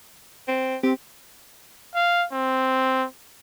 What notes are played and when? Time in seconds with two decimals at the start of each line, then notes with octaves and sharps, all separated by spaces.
0.48 C4
0.83 C4 G4
1.95 F5
2.32 C4